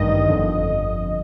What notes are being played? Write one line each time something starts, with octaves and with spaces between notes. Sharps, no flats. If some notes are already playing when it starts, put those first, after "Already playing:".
Already playing: A1 G2 D#3 D#5
G1 F2 D3